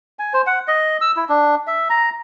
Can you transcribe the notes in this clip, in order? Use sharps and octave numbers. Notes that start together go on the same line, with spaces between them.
G#5
C5
F#5
D#5
E6
E4
D4
E5
A#5